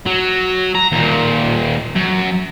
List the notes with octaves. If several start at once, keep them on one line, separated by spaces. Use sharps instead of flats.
F#3
A#5
D#2 A#2
F#2